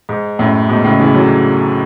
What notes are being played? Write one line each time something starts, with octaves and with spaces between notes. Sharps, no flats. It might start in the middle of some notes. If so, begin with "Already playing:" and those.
G#2
F#2 A2
G#2 B2
A2 C#3
C#3 E3
D3 F#3